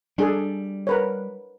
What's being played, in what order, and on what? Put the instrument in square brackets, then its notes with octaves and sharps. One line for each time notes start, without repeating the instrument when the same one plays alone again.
[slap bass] G3 [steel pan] D4 G#4 A4
[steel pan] A#4 B4 C#5